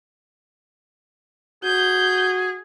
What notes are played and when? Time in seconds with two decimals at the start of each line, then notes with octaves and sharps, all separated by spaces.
1.64 F#4 G#4 G6